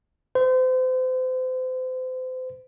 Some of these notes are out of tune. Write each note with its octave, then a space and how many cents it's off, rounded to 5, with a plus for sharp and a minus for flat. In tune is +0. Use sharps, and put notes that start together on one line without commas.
C5 -35